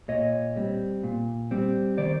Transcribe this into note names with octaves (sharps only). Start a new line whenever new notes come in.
A#2 C#5 D#5
G3 C4
A#2
G3 C4
D#3 C5 D5